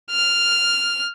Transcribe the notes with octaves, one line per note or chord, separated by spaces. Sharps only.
F6